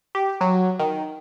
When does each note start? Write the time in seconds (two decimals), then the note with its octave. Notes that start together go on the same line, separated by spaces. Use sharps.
0.15 G4
0.41 F#3
0.80 D#3